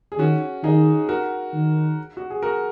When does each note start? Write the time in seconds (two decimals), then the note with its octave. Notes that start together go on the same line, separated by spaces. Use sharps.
0.12 G#4
0.19 D#3 C#4 F#4
0.63 D#3 D#4 G#4
1.08 F#4 A#4
1.54 D#3
2.17 F#4
2.30 G#4
2.42 F#4 A#4